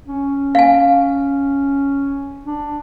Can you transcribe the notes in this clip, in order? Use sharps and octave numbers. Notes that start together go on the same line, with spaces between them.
C#4
F5 G#5
D4